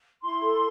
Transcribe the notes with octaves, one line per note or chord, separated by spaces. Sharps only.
E4 C6
A4